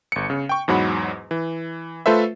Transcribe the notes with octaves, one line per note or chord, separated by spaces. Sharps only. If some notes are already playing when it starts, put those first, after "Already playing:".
G1 C#7
C#3
G5 C#6
E2 G#2 F#3 F#5 B5
E3
A3 F4 A4 B4 C5 E5